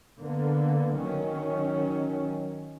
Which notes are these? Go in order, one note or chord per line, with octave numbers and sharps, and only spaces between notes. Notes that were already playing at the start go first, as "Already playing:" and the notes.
D3 A#3 B3
D#3 F#3 C#4